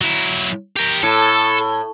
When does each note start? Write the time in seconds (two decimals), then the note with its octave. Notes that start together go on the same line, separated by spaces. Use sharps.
0.01 F#3 E4
0.77 G4 A#4
1.03 A2 A4